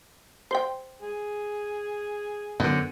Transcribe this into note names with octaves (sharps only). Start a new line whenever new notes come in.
C5 G5
G#4
F#2 D3 B3